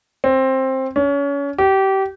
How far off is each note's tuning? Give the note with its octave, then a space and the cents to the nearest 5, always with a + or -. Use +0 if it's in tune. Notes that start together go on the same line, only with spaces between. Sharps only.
C4 +15
C#4 +30
G4 -25